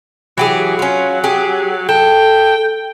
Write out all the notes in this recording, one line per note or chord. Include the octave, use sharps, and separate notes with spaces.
E3 F#3 G4 G#4
C#4 F4
G4 G#4
A4 G5